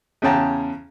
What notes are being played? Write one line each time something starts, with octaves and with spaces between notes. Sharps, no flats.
E2 C#3 C#4 G5 A5 A#5